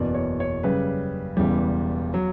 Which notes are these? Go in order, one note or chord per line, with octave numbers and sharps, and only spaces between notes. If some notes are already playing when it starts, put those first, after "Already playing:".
Already playing: F#1 E2 B2 D5
C#5
C#5
F#2 C#3 G3 B4
E1 E2 C#3 E3 G3
F#3